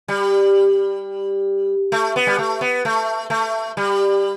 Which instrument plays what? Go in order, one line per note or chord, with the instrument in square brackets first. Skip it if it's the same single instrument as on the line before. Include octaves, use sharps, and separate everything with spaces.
[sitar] G3
A3
B3
G3
A3
B3
A3
A3
G3